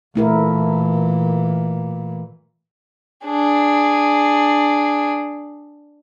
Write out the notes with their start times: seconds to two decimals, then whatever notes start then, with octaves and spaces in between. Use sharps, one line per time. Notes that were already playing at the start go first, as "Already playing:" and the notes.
0.16 A#2 E3 A3 E4 A#4
3.26 D4 G#4